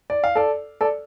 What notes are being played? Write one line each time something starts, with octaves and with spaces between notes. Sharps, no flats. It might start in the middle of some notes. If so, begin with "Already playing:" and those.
D5
F5
A4 D5
A4 D5